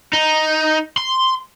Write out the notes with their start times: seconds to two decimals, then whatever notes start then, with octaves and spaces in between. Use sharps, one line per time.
0.13 D#4
0.98 C6